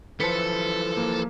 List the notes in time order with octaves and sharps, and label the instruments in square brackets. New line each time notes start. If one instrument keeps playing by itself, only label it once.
[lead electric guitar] E3 F3 [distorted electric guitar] A4 A5 [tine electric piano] B4 C5 [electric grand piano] B6 C#7
[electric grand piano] A#3